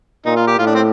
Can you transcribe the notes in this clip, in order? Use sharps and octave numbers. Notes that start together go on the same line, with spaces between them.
A#2 D#4
F4
G4
A2 F4
D4
C4